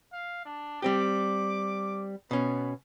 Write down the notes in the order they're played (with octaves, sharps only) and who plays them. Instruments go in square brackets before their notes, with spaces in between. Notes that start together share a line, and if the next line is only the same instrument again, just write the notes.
[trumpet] F5
D4
[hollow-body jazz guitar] G3 C4 G4 [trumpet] D6
[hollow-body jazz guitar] B2 C#4 [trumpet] B3